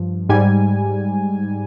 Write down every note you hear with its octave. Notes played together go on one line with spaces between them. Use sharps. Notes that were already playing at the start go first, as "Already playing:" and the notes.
Already playing: G2 F3
G#2 G3 G#5